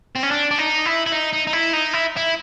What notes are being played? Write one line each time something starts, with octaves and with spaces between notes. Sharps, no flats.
C4
C#4
D4
D4
D#4
E4
E4
D#4
D#4
D#4
E4
D#4
E4
E4